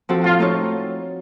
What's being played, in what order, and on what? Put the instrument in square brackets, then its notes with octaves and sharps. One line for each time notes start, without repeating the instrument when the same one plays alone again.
[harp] F3 C4 F#4 A4
[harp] A2 [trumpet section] F4
[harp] A3 D#4 A4 C#5